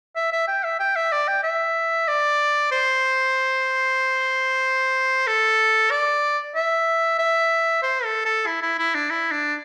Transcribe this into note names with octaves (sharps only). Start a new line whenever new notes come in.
E5
E5
G5
E5
G5
E5
D5
G5
E5
D5
C5
A4
D5
E5
E5
C5
A4
A4
E4
E4
E4
D4
E4
D4